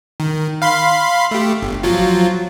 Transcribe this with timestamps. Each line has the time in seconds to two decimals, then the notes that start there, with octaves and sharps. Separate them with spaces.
0.20 D#3
0.62 F5 B5 C6
1.31 A3 G4
1.63 G1
1.83 F3 F#3 F4